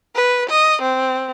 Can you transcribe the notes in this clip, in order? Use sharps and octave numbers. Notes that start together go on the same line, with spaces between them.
B4
D#5
C4